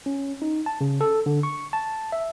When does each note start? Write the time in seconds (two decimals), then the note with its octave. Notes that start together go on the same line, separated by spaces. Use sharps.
0.06 C#4
0.42 D#4
0.66 A5
0.81 C#3
1.01 A4
1.26 D3
1.43 C#6
1.73 A5
2.12 E5